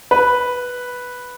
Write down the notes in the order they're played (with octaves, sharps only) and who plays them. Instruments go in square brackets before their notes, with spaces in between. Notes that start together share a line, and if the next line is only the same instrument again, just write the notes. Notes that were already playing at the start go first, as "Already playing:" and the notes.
[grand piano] B4